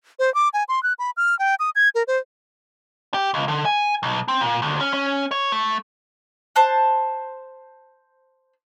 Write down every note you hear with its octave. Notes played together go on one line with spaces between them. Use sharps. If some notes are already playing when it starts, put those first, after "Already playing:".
C5
D6
G#5
C6
F#6
B5
F6
G5
D#6
G#6
A#4
C5
G4
C#2
D3
G#5
B1
C4
A#2
D2
C#4
C#4
C#5
A3
C5 A5 F#6